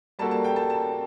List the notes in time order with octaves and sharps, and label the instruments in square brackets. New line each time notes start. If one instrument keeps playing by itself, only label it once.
[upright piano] G3 A#3 F#4 A4 [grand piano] A5
[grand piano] A5
G5
A5
A5